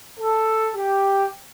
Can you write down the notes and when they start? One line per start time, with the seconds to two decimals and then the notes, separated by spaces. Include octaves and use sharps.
0.19 A4
0.74 G4